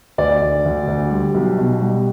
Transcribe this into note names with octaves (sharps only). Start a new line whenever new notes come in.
D2 D5
D2
D2
D2
G3
B1
B2
G3